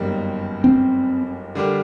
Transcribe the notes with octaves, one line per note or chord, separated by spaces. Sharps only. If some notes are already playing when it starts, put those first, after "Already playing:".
Already playing: G1 F#2 D#3 G3 A#3
C4
D3 G3 D4 G4 A#4